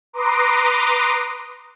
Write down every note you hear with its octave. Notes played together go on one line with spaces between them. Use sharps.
B4 A#5 C6 D6 D#6